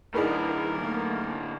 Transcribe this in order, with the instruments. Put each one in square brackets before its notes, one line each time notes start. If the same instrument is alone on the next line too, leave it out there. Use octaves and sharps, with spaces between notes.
[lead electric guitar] A2 D3 [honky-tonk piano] D#4 G#4 B4 [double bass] E4 [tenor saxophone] A#4
[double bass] A3 A#3